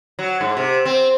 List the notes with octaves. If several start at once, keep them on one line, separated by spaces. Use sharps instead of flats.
F#3
G#2
C3
C4